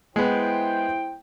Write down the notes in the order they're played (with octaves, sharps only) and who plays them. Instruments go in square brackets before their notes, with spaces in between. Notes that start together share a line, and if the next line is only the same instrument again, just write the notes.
[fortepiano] G#3 B3 [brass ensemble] E4 C5 G5